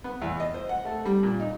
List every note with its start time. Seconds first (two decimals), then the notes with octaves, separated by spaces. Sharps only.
0.04 B3
0.22 E2
0.40 D#5
0.54 C5
0.69 F#5
0.85 A3
1.06 G3
1.23 A#2
1.40 D#4